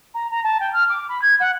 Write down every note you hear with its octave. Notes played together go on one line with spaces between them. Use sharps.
A#5
A#5
A5
G5
F6
D6
B5
G#6
F#5